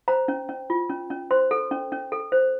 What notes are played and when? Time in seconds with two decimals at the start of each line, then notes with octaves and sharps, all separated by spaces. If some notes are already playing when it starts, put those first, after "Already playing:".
0.08 C5 A#5
0.28 C#4
0.49 C#4
0.70 F4
0.89 C#4
1.10 C#4
1.31 C5 C6
1.51 A4
1.71 C#4
1.92 C#4
2.12 A4
2.32 C5